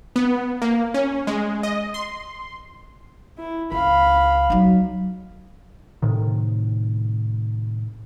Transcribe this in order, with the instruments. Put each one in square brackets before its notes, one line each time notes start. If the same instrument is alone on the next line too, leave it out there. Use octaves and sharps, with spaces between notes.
[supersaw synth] B3
A#3
C#4
G#3
D#5
C6
[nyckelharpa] E4
[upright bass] C#2 [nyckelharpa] F5 B5
[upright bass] F#3 D#4
[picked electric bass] A2 C3 D#3